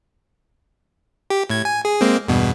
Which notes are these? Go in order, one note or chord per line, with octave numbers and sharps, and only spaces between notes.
G4
A2 G#6
G#5
G#4
G#3 A#3 C4
E2 G2 B2